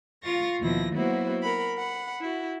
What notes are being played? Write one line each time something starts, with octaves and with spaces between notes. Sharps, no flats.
F4 F5 C#6 A6 A#6
D#2 B2 F3 E4 A#6
F#3 A#3 B3 E4 F#4 C5
A#4 F#5 B5
F#5 B5
E4 F#4